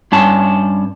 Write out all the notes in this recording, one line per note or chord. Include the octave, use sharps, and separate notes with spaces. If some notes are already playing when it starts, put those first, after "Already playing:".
G2 C#4 A5